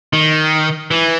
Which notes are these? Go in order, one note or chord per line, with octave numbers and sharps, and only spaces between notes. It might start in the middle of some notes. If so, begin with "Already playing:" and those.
D#3
E3